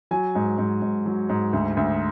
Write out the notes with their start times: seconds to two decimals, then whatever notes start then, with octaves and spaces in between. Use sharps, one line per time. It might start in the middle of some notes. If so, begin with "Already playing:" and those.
0.11 F#3 G#5
0.35 G#2
0.58 G#2
0.82 G#2
1.06 F#3
1.29 G#2
1.53 D2
1.77 D2